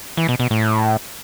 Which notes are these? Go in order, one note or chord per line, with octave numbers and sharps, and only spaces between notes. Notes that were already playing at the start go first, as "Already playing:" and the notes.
E3
B2
B2
A2